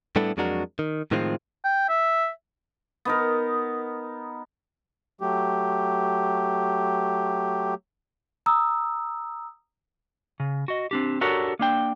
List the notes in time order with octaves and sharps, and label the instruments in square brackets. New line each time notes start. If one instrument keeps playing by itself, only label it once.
[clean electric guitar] A2 G3 B3 D4 E4 A4
F2 F#3 G#3 D4 F#4 A#4
D#3
A2 D#3 F3 G#3 C4 F4
[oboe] G5
E5
[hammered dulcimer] B3 D#4 A#4
[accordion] F#3 A3 G4
[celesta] A#5 D#6 E6
[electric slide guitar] C#3
F#4 D#5
C4 D4 G4
D4 F#4 G4 A4 A#4 C#5
A#3 D4 G5